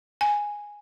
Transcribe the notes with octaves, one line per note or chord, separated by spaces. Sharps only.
G#5